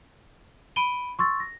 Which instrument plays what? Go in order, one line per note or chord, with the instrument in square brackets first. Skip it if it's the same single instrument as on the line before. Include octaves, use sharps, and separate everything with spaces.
[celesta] B5 D7 D#7 G7
C6 C#6 E6 A6
A#6